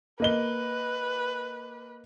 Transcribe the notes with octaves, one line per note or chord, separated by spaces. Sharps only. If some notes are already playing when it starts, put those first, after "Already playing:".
A#3 B4 D#5 G7